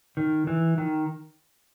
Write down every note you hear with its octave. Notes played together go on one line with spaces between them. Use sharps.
D#3
E3
D#3